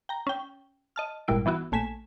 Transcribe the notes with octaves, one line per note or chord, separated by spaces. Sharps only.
G5 A#5
C#4 G5
D#5 A5 F6
G#1 G2 A#2 G3 E4 D7
E3 B3 E4 F#4
A#1 A3 G#5 B6 E7